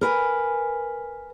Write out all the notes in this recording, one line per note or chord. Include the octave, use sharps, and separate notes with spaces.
A#4 B4 G#5